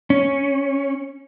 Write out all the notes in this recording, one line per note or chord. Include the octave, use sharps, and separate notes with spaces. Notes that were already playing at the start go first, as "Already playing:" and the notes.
C#4